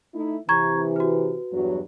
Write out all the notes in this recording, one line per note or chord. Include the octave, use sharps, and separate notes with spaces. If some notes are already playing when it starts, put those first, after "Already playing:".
A3 D#4 E4
C3 E3 A#5 C#6 G#6
F#4 B4
E2 G2 F#3